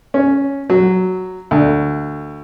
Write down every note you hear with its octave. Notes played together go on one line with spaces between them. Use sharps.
C#4
F#3
D2